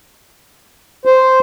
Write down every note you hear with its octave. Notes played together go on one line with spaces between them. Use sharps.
C5